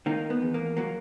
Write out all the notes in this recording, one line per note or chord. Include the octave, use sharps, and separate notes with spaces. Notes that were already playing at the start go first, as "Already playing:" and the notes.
D#3 A#3
B3
E2
A#3
F#3 A#3